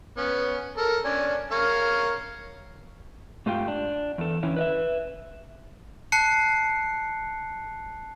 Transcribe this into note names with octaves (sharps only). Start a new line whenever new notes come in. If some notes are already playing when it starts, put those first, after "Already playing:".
B3 C#4
A4 A#4
C#4 D4 G#5
A#4 C#5 F5
G#2 A3 F4 G4 F5 G5
D4
E2 A4
D3 E3 C#4 E4
B4 D#5 E5
A5 F#6 C7 C#7